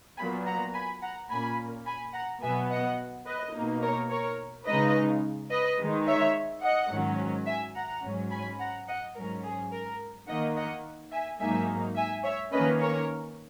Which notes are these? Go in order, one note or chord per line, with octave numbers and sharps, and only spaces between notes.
A#2 F#3 B3 G#5 B5
F#5 A#5
G#5 B5
F#5 A#5
A#2 A#3 C#4 G#5 B5
G#5 B5
F#5 A#5
B2 F#3 B3 E5 G#5
D#5 F#5
B4 D#5
B2 A#3 D#4
A#4 C#5
A#4 C#5
C#3 G#3 D#4 B4 D#5
B4 D#5
D#3 G#3 D#4
C#5 E5
D#5 F#5
G#2 D#3 F#3 C#4
E5 G#5
F#5 A#5
G#2 F#3 C#4
G#5 B5
F#5 A#5
D#5 F#5
G#2 F#3 C#4 A#4
G#4
A#4
D#3 A#3 D#4 D#5 F#5
D#5 F#5
E5 G#5
G#2 F#3 A#3 D#4 E5 G#5
E5 G#5
C#5 E5
D#3 A#3 C#4 B4 D#5
A#4 C#5